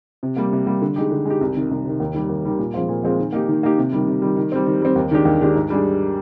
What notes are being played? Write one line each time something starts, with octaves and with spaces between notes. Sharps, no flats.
C3
G3 A#3
C3
G3 A#3
D3
G#3 D#4 G4
D3
G#3 D#4 G4
C2
C3 D#3
C2
C3 D#3
D#2
D#3 G3
D#2
D#3 G3
A#2
F3 G#3 C4 F4
A#2
F3 G#3 C4 F4
D#3
A#3 D#4 G4
D#3
A#3 D#4 G4
C3
D#3 G3
C3
D#3 G3
D#3
G3 C4
D#3
G3 C4
D#2
D#3 G#3 D4 G4
D#2
D#3 G#3 D4 G4
G#2
G3 D4 G#4